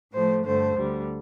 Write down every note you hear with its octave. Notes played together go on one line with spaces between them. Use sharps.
A2 F3 A3 C5
G2 D3 A3 C5
D2 D3 G3